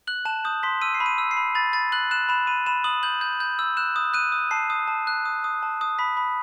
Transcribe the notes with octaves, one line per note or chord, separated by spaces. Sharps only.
F#6 F#7
A5 E7
D#6 G6
C6 B6
E6 D#7
C7
B5
D#7
E6
C7
B5
B5 A6
B5 A6
F#6 F#7
F#6 E7
B5 E7
B5 D#7
B5 E7
D#6 F#7
G6 F#7
G6
G6
E6
F#6 E7
D#6
F#6 D#7
D#6
A5 C7
D#6
A5
F#6
D#6
D#6
A5
D#6
B5 B6
B5